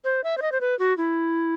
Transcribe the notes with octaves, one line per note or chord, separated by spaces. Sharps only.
C5
E5
C5
D#5
C5
B4
F#4
E4